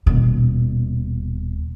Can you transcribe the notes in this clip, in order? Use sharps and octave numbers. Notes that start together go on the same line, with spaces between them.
D#1 B2